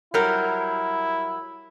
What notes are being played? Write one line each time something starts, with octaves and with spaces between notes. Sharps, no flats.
F#3 G3 E4 A#4